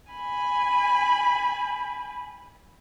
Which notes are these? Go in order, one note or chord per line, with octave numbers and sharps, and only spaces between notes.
G#5 B5